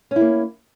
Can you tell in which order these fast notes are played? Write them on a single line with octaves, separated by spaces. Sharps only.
C#4 E4 A#3